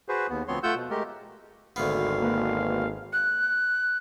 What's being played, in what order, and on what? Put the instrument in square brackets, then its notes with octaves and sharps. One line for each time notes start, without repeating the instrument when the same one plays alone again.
[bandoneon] F#4 G#4 B4 C5
D#2 B3
D2 F3 B3 C4 C#5 C6
A3 F4 F#5 E6 G6
B2
G#3 A3 G4 A#4
[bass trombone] G#1 [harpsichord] D2 B3 [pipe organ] F5
[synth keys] A#3 B4
[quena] F#6